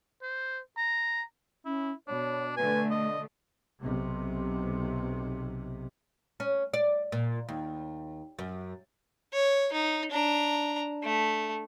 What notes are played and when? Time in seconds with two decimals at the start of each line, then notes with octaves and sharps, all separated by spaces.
0.22 C5
0.78 A#5
1.65 C#4 E4
2.08 B2 D4 C#5
2.57 B2 D3 A3 B4 G#5
2.91 D5 D#5
3.81 B1 C3
6.40 C#4
6.74 D5
7.12 A#2
7.49 D#2
8.39 F#2
9.33 C#5
9.73 D#4
10.11 D4 A#5
11.03 A3